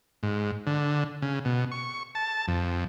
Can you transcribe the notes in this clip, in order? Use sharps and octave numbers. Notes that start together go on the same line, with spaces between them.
G#2
D3
C#3
B2
C#6
A5
F2